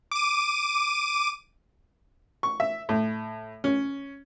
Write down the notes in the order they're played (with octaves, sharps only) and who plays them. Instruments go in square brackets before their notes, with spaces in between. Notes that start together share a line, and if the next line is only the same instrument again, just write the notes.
[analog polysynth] D6 D#7
[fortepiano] C#6
E5
A2
C#4